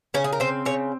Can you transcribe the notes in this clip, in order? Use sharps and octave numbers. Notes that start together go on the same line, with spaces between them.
C#3 C#4
G#4
A#4
C4 C5
C#3 C#5